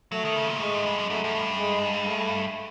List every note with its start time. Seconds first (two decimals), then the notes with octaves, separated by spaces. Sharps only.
0.12 F#3 A3
0.25 D#3
0.36 C#3
0.49 A#2
0.55 G#2
0.60 A2 G#3
0.73 G#2
0.86 G2
0.98 F#2
1.10 F#2 A3
1.24 F#2
1.35 G2
1.59 G#3
2.08 A3